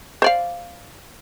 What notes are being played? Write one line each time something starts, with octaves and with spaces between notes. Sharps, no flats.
C5 D5 F5